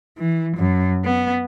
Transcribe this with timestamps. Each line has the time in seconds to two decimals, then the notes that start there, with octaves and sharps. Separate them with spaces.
0.18 E3
0.57 F#2
1.05 B3